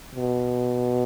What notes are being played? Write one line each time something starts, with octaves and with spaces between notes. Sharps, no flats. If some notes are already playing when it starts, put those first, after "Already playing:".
B2